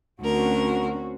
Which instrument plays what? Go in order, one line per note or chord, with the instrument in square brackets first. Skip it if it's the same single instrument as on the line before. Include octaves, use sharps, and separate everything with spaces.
[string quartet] D2 A#4 [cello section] C4 C#4 F#4